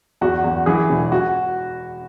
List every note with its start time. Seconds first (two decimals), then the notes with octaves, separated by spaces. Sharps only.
0.21 E2 F#4
0.44 E2
0.66 E3 G#4
0.89 E1
1.12 F#4